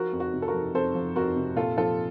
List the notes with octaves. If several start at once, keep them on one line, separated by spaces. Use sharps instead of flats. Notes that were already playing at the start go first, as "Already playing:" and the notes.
Already playing: F3 F#4 A#4
F2
F#4
C3
A4
F#4 A#4
F3
F2 A4 C5
F3
F2 F#4 A#4
C3
A#2 F4 A4
F3 F4 A4